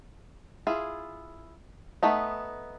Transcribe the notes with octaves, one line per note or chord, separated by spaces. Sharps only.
E4 F4 G#4
A3 B3 D#4